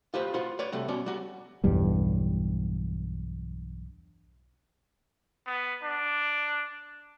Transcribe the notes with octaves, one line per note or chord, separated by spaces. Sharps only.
F4 G4 B4 C5
F4 F#4 B4 C5
B4 C#5 D5
C3 G3 A3 F#4
B2 C#4 D5
G3 F#4
B1 E2 G2 G3
B3
D4